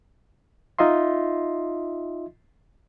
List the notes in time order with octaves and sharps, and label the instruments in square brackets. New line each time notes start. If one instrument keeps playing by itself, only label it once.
[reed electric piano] D#4 F4 D#5 E5 C6